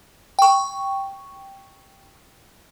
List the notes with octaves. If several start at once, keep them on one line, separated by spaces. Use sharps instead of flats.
G5 C#6